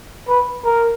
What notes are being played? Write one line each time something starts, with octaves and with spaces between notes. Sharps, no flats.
B4
A#4